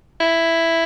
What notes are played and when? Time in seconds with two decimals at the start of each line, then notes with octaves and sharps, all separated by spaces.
0.20 E4